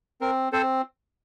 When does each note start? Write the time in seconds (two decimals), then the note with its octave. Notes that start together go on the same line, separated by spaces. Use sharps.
0.21 C4 A#4
0.53 C4 A4 C5